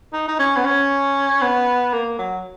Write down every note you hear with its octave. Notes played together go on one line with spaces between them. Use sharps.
D#4
D#4
C#4
B3
C#4
B3
A#3
F#3